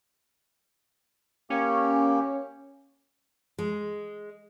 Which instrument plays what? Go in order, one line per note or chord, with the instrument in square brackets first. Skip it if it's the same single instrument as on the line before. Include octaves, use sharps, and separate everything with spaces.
[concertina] A#3 G4 [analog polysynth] C#4
[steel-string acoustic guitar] G#3